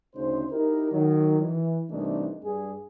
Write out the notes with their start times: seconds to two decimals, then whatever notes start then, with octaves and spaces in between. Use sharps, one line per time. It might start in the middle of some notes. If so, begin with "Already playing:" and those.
0.16 D2 C#3 D#4 C5
0.52 D#4 E4 G4 A#4
0.92 D#3 F#3
1.40 E3
1.90 C2 E3 A3 D4 D#4
2.43 G2 G#4